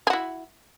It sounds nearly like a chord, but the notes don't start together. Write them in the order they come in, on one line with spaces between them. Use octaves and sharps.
G#4 F#4 E4